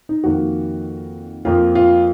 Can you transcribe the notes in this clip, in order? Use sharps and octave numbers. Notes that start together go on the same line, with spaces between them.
D#4
F2 D#3 A#3 F#4
F2 F3 A#3 F4
F4